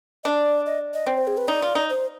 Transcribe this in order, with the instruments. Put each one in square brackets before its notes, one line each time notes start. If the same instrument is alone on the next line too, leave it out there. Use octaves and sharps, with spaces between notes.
[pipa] D4 [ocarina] D5 D#5
[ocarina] D#5
D#5
[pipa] C4 [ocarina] D5
[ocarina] C5
G#4
B4
[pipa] D#4 [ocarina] D5
[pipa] F4
D#4
[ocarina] C5